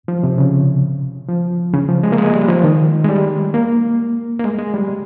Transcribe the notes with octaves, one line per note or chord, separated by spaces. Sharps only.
F3
C3
C#3
F3
C#3
F3
G#3
A#3
G#3
G3
F3
D#3
G#3
G3
A#3
A#3
G#3
G#3
G3